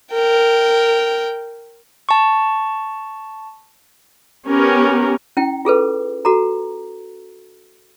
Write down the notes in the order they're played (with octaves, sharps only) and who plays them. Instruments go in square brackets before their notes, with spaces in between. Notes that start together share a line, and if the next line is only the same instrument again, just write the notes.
[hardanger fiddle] A#4 G5
[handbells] A5 C#6
[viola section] B3 C#4 G4 A#4
[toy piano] C#4 E4 G5
F4 G#4 A4 B4
F#4 A4 A#5